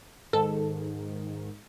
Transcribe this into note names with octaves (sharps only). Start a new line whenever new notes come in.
G#2 D#3 A4